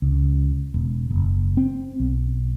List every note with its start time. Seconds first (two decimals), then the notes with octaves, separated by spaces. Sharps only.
0.02 C#2
0.74 E1
1.11 F#1
1.57 C4
2.00 B1